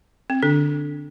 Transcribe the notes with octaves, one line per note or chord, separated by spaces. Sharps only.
C4
D3 D4